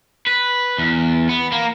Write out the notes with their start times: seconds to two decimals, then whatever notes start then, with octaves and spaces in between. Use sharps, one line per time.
0.27 B4
0.78 E2
1.29 B3
1.52 A#3